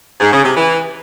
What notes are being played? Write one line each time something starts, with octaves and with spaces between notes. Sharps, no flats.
G#2
C#3
C3
E3